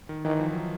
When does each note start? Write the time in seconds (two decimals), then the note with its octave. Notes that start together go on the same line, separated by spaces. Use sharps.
0.09 D#3
0.25 D#3 E3
0.40 F3
0.53 F#3